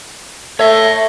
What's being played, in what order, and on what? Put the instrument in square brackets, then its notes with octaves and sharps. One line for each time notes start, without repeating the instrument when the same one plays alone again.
[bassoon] A3 [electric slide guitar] C#5 E5